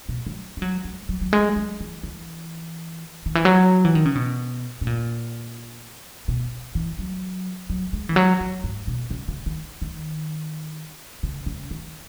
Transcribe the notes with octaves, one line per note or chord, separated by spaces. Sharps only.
B2
F#3
G#3
F#3
G#3
F#3
F#3
G#3
F#3
E3
E3
D#3
E3
F#3
E3
D#3
C#3
B2
B2
A#2
B2
E3
F#3
F#3
G#3
E3
F#3
F#3
G#2
B2
C#3
C#3
D#3
D#3
C#3
C#3
D#3